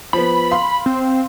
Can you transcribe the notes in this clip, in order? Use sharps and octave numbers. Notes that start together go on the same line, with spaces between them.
F3 B3 B5
F5 C6
C4